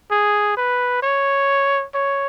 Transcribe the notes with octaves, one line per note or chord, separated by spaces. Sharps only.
G#4
B4
C#5
C#5